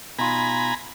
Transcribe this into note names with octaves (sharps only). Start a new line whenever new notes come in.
B2 D#4 F4 G#5 A#5 B5